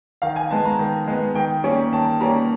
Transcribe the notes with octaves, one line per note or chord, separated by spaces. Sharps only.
D#3 F5
G#5
G#3 B3 A5
A#5
D#3
G#3 B3
D#3 G5
G3 A#3 C#4
D#3 A5
G3 A#3 C#4 A#5